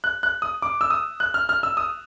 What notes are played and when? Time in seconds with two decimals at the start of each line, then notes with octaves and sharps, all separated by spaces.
0.04 F#6
0.23 F#6
0.42 D#6
0.62 D6
0.81 E6
0.90 D#6
1.20 F#6
1.34 F6
1.49 F6
1.63 E6
1.77 D#6